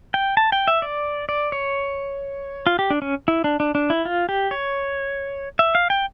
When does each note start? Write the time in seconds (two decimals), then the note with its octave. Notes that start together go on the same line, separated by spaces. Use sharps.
0.14 G5
0.37 A5
0.52 G5
0.68 E5
0.82 D5
1.29 D5
1.52 C#5
2.67 F4
2.79 G4
2.90 D4
3.02 C#4
3.28 E4
3.44 D4
3.60 D4
3.75 D4
3.90 E4
4.05 F4
4.29 G4
4.51 C#5
5.59 E5
5.75 F5
5.90 G5